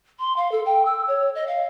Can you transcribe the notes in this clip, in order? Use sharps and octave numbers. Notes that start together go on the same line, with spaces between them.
C6
F5
A4
G5
E6
C#5
D#5
F5